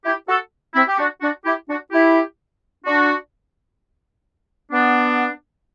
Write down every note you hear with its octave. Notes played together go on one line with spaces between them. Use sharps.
E4 G4
F#4 A4
C4 E4
G4
D4 F#4
D4 F#4
E4 G4
D4 F#4
E4 G4
D4 F#4
B3 D4